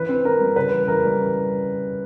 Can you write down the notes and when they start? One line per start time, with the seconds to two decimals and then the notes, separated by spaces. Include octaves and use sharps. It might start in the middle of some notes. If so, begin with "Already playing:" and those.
Already playing: E3 B4
0.09 C4
0.25 C4 A#4
0.40 G3
0.56 C#3 B4
0.72 E3
0.88 E3 A#4
1.04 G3